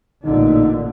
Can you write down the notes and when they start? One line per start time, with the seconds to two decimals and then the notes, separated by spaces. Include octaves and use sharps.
0.24 A1 A#2 D3 D#4